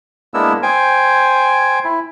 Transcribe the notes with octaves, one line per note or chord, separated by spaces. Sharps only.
G#3 A#3 B3 D4 E4 E6
C5 G5 G#5
E4